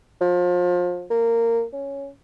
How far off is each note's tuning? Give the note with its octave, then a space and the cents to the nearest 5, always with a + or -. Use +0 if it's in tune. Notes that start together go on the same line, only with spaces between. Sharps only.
F3 +30
A#3 -15
C#4 +0